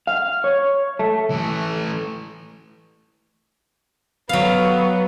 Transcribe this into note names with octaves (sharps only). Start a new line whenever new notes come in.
F5
C#5
A3
E3 A3
F#3 B3 F5